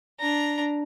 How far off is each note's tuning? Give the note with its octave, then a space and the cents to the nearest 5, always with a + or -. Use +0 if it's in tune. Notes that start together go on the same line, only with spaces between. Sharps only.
D4 +0 A#5 +0